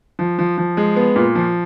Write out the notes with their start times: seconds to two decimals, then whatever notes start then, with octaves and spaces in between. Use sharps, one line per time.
0.19 F3
0.39 F3
0.58 F3
0.77 G#3
0.96 B3
1.16 A#2
1.35 F3